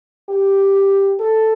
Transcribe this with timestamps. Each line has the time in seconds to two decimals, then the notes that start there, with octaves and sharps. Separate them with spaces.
0.29 G4
1.20 A4